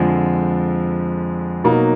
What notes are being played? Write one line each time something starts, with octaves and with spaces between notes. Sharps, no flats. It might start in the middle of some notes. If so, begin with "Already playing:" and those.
Already playing: F2 D3 F3 G#3 C4
B2 F#3 A#3 D#4